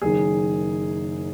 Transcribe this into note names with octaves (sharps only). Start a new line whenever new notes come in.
F#1 F#2 D#3 G#4